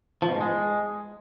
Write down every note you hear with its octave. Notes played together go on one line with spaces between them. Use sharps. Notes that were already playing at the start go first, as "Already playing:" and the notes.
F3
B2
G#2
G#3